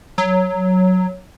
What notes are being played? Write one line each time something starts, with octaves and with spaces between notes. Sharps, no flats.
F#3